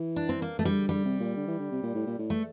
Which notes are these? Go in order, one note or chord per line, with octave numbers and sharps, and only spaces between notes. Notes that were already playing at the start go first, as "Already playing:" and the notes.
Already playing: E3
D4
C4
A#3
A3
D3 G3
D3 G3
C3
A#2
D3
E3
D3
C3
A#2
A2
A#2
A2
A3